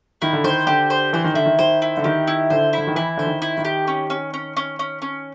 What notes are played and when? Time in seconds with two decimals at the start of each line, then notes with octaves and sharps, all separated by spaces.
0.22 D#3 E4
0.33 D3
0.44 D#3 C5
0.67 D3 G4
0.90 C5
1.13 E3 C5
1.24 D#3
1.34 D3 E4
1.46 D#3
1.59 D#3 C5
1.82 E4
1.97 D3
2.04 D#3 G4
2.27 E4
2.50 D3 C5
2.73 D3 E4
2.87 D#3
2.95 E3 E4
3.17 D3 C5
3.27 D#3
3.42 E4
3.57 D#3
3.65 G4
3.87 C#4
4.10 C#4
4.34 C#4
4.57 C#4
4.79 C#4
5.02 C#4